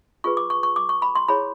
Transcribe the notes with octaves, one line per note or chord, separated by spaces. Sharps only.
F4 G#4 B4 C#6
D6
C#6
C#6
D6
C#6
B5
C6
E4 G#4 C#5 B5